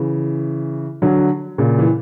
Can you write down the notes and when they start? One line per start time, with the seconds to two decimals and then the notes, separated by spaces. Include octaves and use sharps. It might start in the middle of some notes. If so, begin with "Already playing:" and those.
Already playing: C#3 E3
1.02 D3 F#3
1.58 A#2 C#3
1.79 E3